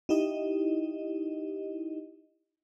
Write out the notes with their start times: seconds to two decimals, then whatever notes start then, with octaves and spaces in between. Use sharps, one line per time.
0.09 D#4 E4 G4 D#5